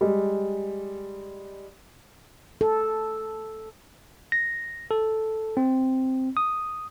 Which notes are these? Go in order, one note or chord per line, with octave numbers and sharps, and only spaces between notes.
G3 G#3
A4
A#6
A4
C4
D#6